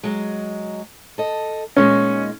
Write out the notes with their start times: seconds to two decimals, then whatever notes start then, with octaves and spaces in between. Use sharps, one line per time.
0.03 F#3 G#3
1.18 A4 D#5
1.76 A#2 G#3 C#4 D#4